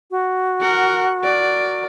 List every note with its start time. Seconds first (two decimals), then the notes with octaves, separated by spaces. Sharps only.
0.11 F#4
0.61 A#4 F#5
1.22 A#4 D5